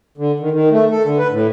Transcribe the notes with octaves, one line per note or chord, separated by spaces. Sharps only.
D3
D#3
D#3
A3
A4
D3
B4
A2